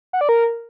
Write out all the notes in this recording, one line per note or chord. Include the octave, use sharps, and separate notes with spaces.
F#5
D5
A#4